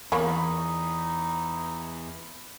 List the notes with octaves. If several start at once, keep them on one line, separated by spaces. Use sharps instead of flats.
E2 A#3 D#4 C#5 B5